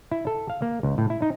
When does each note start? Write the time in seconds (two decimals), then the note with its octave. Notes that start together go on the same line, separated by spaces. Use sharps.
0.11 E4
0.27 A4
0.50 F5
0.62 A#3
0.83 C#2
0.98 A2
1.10 E4
1.22 D#4